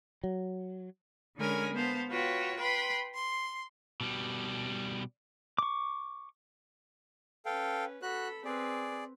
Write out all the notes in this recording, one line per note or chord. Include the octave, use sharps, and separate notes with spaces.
F#3
D3 G#3 C#4 A#4 G#5 B5
B3 C5 F5 A5
F4 F#4 B4 C#5 G5
B4 G5 B5 C6
C6
B2 G3
C#6 D6
C#4 A4 B4 F5 G5
F#4 A4 B5 F#6
C4 G#4 B4 D5